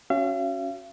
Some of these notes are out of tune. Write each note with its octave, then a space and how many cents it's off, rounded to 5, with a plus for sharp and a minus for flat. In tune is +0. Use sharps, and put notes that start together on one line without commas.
C#4 +0 F#4 +0 F5 -45